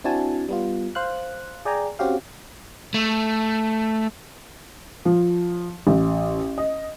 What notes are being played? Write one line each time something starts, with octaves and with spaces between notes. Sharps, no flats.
C4 D4 E4 F#4 G#5 A5
G3 B3 F4
C5 F5 F#6
G#4 D5 G5 G#5 A#5
C4 C#4 F#4 G4 F5
A3
F3
A1
D#5